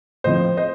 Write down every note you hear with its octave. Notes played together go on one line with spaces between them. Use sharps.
A2 F3 C4 C5 D#5
C5 D#5